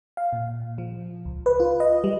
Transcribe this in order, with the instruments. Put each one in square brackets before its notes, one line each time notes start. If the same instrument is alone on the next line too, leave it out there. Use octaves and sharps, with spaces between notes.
[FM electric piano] F5
A#2
F3
C#2
B4
F4
D#5
G3